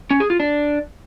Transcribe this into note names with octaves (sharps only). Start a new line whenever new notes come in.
C#4
G#4
F4
D4